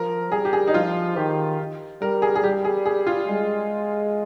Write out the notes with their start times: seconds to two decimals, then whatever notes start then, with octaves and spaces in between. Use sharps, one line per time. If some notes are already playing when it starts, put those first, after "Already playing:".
Already playing: F3 A#4
0.32 G3 G#4
0.45 G4
0.53 G#4
0.68 D#4
0.74 F3 F4
1.16 D#3 G4
2.02 G3 A#4
2.22 G#4
2.35 G#4
2.44 G3 G4
2.65 G#4
2.86 G#4
3.07 F4
3.29 G#3